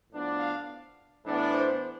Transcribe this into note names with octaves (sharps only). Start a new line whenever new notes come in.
A2 F3 B3 D4
F5
A2 E3 B3 D4
C5